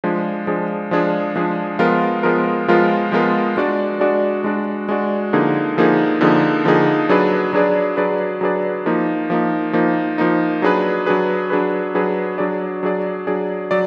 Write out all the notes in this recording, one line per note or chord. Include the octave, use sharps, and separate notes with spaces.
F3 G#3 D4 G#4
F3 G#3 D4 G#4
F3 G#3 D4 G#4
F3 G#3 D4 G#4
F3 G#3 B3 F4 A#4
F3 G#3 B3 F4 A#4
F3 G#3 B3 F4 A#4
F3 G#3 B3 F4 A#4
G#3 D4 F#4 D5
G#3 D4 F#4 D5
G#3 D4 F#4 D5
G#3 D4 F#4 D5
D3 F3 A#3 D#4 G#4
D3 F3 A#3 D#4 G#4
D3 F3 A#3 D#4 G#4
D3 F3 A#3 D#4 G#4
F#3 D4 G#4 B4 D5
F#3 D4 G#4 B4 D5
F#3 D4 G#4 B4 D5
F#3 D4 G#4 B4 D5
F3 A#3 D#4
F3 A#3 D#4
F3 A#3 D#4
F3 A#3 D#4
F#3 D4 G#4 B4
F#3 D4 G#4 B4
F#3 D4 G#4 B4
F#3 D4 G#4 B4
F#3 D4 G#4 D5
F#3 D4 G#4 D5
F#3 D4 G#4 D5
F#3 D5